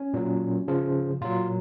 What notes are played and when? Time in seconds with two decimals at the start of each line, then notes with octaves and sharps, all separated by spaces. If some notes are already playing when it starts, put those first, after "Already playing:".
Already playing: C#4
0.14 A#2 F#3
0.68 C#3 F3
1.21 A#2 F#3 F4